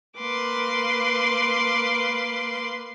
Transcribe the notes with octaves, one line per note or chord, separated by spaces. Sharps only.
A#3 B4 C6 D6